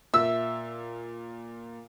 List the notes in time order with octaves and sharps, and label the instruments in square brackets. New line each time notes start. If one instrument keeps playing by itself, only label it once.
[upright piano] A#2 F4 [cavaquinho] E5 [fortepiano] E6